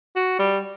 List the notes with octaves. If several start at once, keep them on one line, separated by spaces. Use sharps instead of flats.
F#4
G3